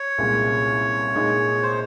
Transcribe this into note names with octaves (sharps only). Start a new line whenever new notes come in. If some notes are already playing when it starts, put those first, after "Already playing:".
Already playing: C#5
C2 A#2 G#3 C#4
A#2 G#3 D#4
C5